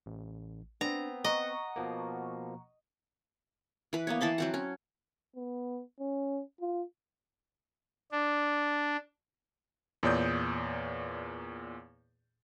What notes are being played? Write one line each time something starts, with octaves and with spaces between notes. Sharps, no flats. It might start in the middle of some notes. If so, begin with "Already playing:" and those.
A1
B3 C4 D4 A#5
D#5 F#5 A#5 C#6
B2 F3 A#3
E3 B4
A#3 B3 C#5
E3 A5 B5 C6
F#3 C4 F#5
C#4
B3
C#4
F4
D4
E2 A#2 C#5 D5 D#6 G6